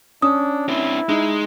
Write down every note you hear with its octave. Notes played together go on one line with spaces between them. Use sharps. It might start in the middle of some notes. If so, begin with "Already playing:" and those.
C#4 D4 D#6
C4 D4 E4
G#3 D#4